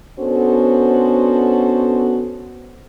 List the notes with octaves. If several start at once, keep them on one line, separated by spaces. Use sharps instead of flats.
B3 C#4 D4 F#4 A4 C5